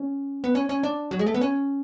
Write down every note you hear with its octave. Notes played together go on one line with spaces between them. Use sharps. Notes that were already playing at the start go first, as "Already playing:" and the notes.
Already playing: C#4
B3
C#4
C#4
D4
F#3
G#3
A3
B3
C#4